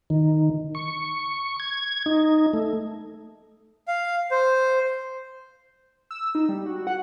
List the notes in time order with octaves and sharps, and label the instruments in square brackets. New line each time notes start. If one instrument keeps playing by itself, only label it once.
[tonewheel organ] D#3
C#6
G#6
D#4
A3
[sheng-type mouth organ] F5
C5
[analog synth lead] E6
D#4
G3
F#4
F#5